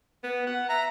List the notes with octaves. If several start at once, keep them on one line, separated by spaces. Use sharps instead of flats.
B3
F#5
E5 A#5